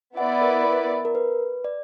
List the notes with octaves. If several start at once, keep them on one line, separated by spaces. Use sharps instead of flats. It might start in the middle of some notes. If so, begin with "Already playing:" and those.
B3 E4 B4 D5 F#5
A#4
A#4
B4
D5